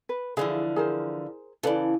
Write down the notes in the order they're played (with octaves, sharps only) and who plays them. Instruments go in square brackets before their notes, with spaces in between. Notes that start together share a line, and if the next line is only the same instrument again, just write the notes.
[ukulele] B4
[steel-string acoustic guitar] D3 E3 F3 [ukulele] E4 G#4 F5
[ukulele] G#4 A#4 C5
[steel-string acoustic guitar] C#3 E3 [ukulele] A4 B4 D5